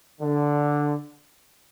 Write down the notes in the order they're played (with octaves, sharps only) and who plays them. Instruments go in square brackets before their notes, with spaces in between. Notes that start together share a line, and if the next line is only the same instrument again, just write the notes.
[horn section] D3